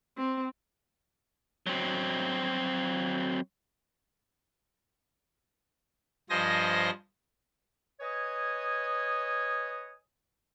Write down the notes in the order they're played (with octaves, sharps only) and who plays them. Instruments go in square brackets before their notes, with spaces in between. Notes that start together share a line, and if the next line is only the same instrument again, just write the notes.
[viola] C4
[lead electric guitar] F#3 C4
[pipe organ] G2 F3 C5 D#5 G#5 A#6
[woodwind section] B4 C#5 D#5 G#5 D#6